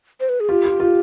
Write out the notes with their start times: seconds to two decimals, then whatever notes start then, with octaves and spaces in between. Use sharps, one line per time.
0.20 C5
0.29 B4
0.40 G#4
0.49 F4 G4
0.65 F4
0.80 F4